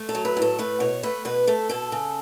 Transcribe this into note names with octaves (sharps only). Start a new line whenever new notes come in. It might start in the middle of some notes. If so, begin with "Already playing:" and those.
Already playing: A3
A4
F#3
B4
A2
A4
A3 B4
B2 C#5
A3 B4
B2 B4
A3 A4
B2 A4
C#3